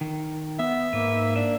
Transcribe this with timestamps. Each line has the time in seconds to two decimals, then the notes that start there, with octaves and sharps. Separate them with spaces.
0.01 D#3
0.59 B3 E5
0.93 G#2 A#3 B4
1.36 D4 E5